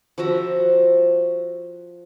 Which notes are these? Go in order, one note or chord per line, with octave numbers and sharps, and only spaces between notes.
F3 F#4 E5 A#5